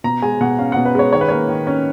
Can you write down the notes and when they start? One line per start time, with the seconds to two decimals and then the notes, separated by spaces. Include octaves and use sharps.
0.04 B2 A#5
0.22 G#3 G#5
0.41 B2 F#5
0.59 C#4 F5
0.72 B2 F#5
0.85 B4
0.95 G#3 C#5
1.13 D#3 C#5
1.21 B4
1.29 A#3 C#5
1.49 D#3
1.67 C#4